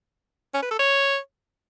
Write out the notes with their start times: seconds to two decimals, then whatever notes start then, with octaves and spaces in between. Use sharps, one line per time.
0.54 C#4
0.62 B4
0.71 A4
0.79 C#5